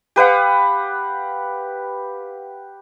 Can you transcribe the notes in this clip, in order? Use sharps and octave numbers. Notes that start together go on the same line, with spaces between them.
G4 B4 F5 F#5